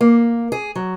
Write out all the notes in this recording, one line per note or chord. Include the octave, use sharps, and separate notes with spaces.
A#3
G#4
F#3